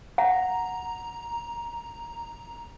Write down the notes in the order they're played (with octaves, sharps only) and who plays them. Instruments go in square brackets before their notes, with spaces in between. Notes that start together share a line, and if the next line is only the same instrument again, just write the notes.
[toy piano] F#5 [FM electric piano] A#5